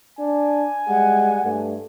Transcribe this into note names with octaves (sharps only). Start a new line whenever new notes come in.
D4 G#5
G3 G#3 F#5
G2 A3